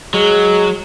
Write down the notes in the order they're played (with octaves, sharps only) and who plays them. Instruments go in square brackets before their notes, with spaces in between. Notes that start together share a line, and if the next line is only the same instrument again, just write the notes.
[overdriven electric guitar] F#3 [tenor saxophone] G#3